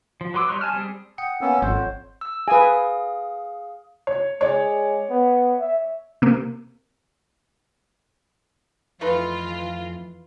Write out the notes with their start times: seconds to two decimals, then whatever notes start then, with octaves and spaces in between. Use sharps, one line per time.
0.21 F3
0.34 F#3 B4 C6 D6 E6
0.48 G3 D#4 C#5 C6 F#6
0.61 G#5 A5 F6
0.73 G3 C4 G#4
1.18 F#5 G5 D#6 C#7
1.41 A#3 B3 C#4 E6
1.62 G#1 F2 C5 C#5 F#5
2.21 E6
2.48 G#4 B4 F5 G#5 D#6
4.07 C#5
4.41 G#3 C#5 D5
5.10 B3
5.60 E5
6.22 C3 A#3
9.01 F2 E3 A3 D#4 F4 B4